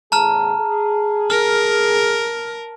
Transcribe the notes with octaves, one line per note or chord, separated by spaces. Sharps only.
E2 A2 G#4 A5 A#5 F6
G#4
A#4 F6